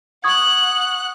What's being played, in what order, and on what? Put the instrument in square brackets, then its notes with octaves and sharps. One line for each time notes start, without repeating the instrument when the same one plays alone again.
[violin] F#5 F#6 [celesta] C#6 D#6 G#6